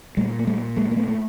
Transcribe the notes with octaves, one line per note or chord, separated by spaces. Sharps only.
A#2 G3 A3
A#3
G3 A3
G#3 A#3
A#3
A3 B3
A3